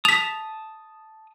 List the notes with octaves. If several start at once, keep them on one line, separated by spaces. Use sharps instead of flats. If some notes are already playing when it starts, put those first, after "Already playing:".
A5 D#6 B6 F7